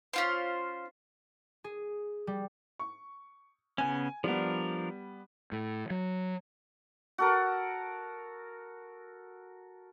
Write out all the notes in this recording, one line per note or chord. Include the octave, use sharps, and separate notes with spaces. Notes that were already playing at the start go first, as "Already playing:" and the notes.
C#4 F4 C5
G#4
G3
C#6
C#3 B3 C#4 G#5
F3 G3 B3 D4 A#4
A2
F#3
F#4 A4 A#4